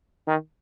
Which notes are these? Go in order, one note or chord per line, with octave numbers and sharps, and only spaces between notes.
D#3